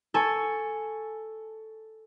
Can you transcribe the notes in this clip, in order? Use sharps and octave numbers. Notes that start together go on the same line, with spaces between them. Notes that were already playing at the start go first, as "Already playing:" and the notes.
A4 G#5 C#6